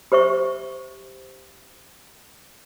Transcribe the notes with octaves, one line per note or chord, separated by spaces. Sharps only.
G4 C5 E5 C#6